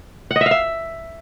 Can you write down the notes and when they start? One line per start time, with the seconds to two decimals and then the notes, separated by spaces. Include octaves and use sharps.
0.31 F#5
0.36 D#5
0.41 E5
0.46 F5
0.51 E5